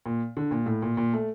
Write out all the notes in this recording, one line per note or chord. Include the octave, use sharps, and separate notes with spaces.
A#2
D3
A#2
A2
A#2
A#2
A3